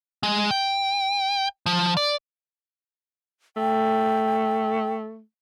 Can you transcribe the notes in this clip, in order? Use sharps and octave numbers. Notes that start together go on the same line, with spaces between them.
G#3
G5
F3
D5
A3 G5